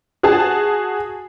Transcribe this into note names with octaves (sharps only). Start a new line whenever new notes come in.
F#4 G#4 A5